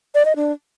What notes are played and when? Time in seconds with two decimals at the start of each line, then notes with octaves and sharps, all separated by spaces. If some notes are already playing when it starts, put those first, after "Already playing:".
0.15 D5
0.25 D#5
0.36 D4